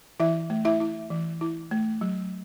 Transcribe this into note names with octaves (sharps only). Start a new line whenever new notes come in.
E3 E4 E5
A3
E4 E5
E4
E3
E4
A3
F#3